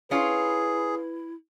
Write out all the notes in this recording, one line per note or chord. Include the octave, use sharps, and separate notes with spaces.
C#4 E4 F4 G#4 B4